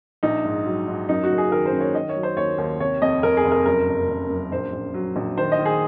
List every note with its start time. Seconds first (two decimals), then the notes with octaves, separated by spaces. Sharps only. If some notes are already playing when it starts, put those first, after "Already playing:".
0.23 A#1 D#4
0.45 G#2
0.66 F#3
0.88 G#2
1.09 F#2 D#4
1.23 F#4
1.30 F#1
1.38 G#4
1.51 D#3 A#4
1.66 C5
1.73 F#2
1.80 C#5
1.94 D#3 D#5
2.09 C#5
2.16 F#3
2.23 C5
2.37 D#2 C#5
2.58 D#2
2.80 C3 C#5
3.02 F2 D#5
3.23 F1 A#4
3.37 G#4
3.45 F1
3.51 A#4
3.66 F#2 A#4
3.87 F#1
4.09 F#1
4.30 F#2
4.52 A#1 C5
4.73 A#1
4.94 F#3
5.16 A#1
5.37 D#3 C5
5.52 D#5
5.59 D#3
5.65 G#4